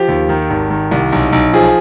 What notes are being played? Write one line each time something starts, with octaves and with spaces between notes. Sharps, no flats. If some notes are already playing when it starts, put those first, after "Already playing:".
Already playing: F3 G4
D#2
D#3
G#1
D#3
C2
B1
B1
F3 G#4